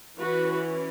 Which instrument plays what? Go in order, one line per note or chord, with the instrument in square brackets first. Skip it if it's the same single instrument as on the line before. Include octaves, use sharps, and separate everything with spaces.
[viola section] E3 C#4 F#4 B4